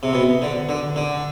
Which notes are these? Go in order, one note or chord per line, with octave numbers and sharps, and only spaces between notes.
C3
B2
D3
D3
D3